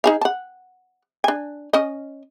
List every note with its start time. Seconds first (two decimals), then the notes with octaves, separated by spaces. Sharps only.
0.04 D#4 G#4 F5
0.21 F#5 A5
1.24 D4 G#5
1.73 C#4 D#5